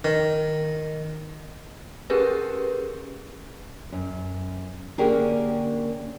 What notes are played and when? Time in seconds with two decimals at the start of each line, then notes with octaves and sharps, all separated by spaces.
0.04 D#3
2.10 C#4 G4 G#4 A#4 B4
3.92 F#2
4.98 D3 A#3 C#4 G4 G#4 A#4